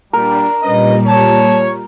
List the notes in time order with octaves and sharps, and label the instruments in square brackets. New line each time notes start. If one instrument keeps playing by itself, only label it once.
[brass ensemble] A#2 G3 [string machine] D4 [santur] A#4
[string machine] A#2 G3 [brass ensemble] C#4 B4 D#5
[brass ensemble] C#5 [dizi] A5